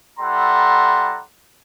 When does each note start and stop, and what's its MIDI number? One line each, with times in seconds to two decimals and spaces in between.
0.20 1.21 55
0.20 1.21 64
0.20 1.21 69
0.20 1.21 78
0.20 1.21 82
0.20 1.21 84